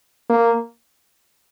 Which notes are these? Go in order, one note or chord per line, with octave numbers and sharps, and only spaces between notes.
A#3